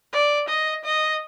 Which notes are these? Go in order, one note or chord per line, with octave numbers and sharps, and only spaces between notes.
D5
D#5
D#5